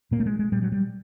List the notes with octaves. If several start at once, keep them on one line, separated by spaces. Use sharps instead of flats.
A#2 A#3
A3
G#3
G#3
A#2 G3
F#3
G3